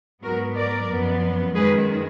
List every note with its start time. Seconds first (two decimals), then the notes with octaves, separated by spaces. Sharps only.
0.23 G#2 F#3 B3 F#4 A#4
0.55 A#4 D5
0.89 F#2 F3 B3
1.55 F#2 D#3 G#3 G#4 B4